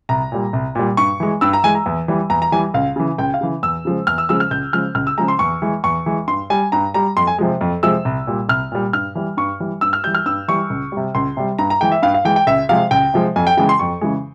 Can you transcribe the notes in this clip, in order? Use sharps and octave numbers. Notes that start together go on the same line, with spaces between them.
C2 A#5
A#2 G3
C2
A#2 G3
G2 C#6
E3 G#3
G2 E6
A#5
E3 G#3 G#5
A#5
E2
E3 G3
E2 A#5
A#5
E3 G3 G#5
C#2 F5
C#3 E3
C#2 G5
F5
C#3 E3
E2 E6
C#3 F3 G#3
E2 F6
E6
C#3 F3 G#3 E6
F6
C#2 G6
C#3 F3 G#3 F6
C#2 F6
E6
C#3 F3 G#3 A#5
C6
E2 C#6
E3 G#3
E2 C#6
E3 G#3
G2 C6
G3 G#5
G2 A#5
G3 A#5
F2 C6
G#5
C3 F3 G#3
F2
C3 F3 G#3 E6
C2
A#2 G3
C2 F6
A#2 G3
G2 F6
E3 G3
G2 C#6
E3 G3
G2 E6
F6
E3 G3 G6
F6
G2 E6
E3 G3 C#6
C#2
C3 G3
C#2 C6
C3 G3
G2 A#5
A#5
E3 G#3 G5
E5
G2 F5
F5
E3 G#3 G5
G5
C#2 E5
C3 F3 G#3 F5
C#2 G5
C3 F3 G#3
F2 G#5
G5
C#3 E3 G#3 G5
C6
F2 C#6
C#3 E3 G#3